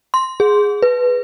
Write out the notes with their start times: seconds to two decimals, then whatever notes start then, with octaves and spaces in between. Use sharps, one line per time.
0.14 C6
0.40 G#4
0.82 B4